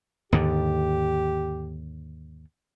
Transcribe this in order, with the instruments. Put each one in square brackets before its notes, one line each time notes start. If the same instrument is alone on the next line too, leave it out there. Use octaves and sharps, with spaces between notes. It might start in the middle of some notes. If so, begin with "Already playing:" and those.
[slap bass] D#2 G#2 D3 [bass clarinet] G4